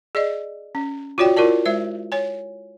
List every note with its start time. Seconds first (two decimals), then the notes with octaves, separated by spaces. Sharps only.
0.15 G#4 D5 D#5
0.75 C#4
1.18 F4 F#4 C#5 D5 G5
1.37 E4 F4 A#4 D5 A5
1.66 G#3 C5 E5
2.12 C#5 G#5